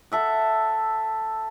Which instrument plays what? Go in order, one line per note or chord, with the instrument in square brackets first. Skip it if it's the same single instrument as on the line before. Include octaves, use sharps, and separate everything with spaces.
[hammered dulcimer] A4 E5 F#5